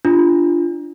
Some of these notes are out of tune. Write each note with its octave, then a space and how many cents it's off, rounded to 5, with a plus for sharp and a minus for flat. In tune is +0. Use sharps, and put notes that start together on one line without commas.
D4 +0 F4 -20